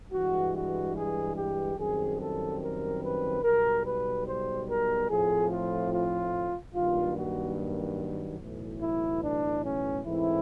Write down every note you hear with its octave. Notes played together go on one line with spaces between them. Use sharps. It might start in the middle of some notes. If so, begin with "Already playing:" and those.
G2 E3 G#3 F#4
F#4
G#4
G4
F#2 D#3 G3 C4 G#4
A4
A#4
B4
B1 B2 G3 A#4
B4
C5
A#4
A2 F3 A3 C4 G#4
F4
F4
G2 D#3 F#3 A#3 F4
F#4
B1 A2 E3
E4
D4
C#4
G#2 E3 A3 C4 E4